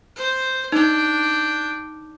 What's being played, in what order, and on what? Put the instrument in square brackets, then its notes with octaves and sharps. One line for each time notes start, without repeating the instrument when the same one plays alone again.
[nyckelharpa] C5
[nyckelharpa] D4 G5 [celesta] D#4